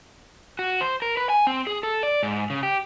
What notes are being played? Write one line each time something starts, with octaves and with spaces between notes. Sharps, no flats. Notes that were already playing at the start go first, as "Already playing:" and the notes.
F#4
C5
A#4
B4
G#5
C4
G#4
A4
D5
G#2
C#3
G4